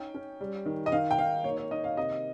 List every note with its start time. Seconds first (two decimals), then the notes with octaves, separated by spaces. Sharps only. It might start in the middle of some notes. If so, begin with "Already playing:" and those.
Already playing: C#4 D#4 G5
0.14 C#4
0.41 G3
0.66 D#3
0.86 D#5
0.92 D#3 F5
1.11 G5
1.18 D#4 F5
1.44 A#3 C#5
1.57 C#5
1.71 D#3 D#5
1.84 F5
1.97 C3 D#5